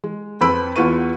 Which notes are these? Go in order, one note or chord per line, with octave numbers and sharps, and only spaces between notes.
G#3
F2 C4 B4 B5 E6 D7
E2 F4 B4 C#6 D#7